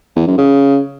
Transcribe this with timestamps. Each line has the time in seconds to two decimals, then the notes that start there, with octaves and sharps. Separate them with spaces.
0.16 E2
0.27 F#2
0.38 C#3